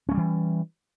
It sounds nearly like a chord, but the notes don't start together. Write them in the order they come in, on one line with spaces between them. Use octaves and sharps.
C#4 A3 G3 E3